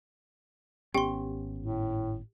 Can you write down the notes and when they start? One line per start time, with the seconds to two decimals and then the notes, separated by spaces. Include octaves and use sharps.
0.94 G#1 B3 C#4 G4 G5 C6
1.58 A2